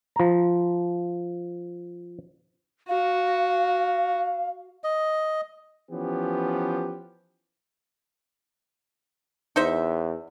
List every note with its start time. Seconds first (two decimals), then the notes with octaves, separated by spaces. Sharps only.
0.16 F3 A#5
2.89 F#4 F5
4.84 D#5
5.91 E3 F3 B3 C#4 G4
9.56 E2 D#4 C5 E5